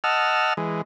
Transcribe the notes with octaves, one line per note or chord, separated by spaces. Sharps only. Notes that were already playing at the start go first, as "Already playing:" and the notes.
D#5 F#5 A5 E6 F6
E3 G#3